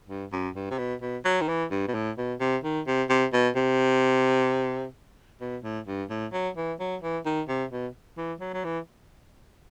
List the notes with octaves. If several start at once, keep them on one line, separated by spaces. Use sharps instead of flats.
G2
F#2
G2
C3
B2
B2
F#3
D#3
E3
G2
B2
A2
B2
C3
D#3
C3
C3
B2
C3
B2
A2
G2
A2
F#3
E3
F#3
E3
D#3
C3
B2
E3
F#3
F#3
E3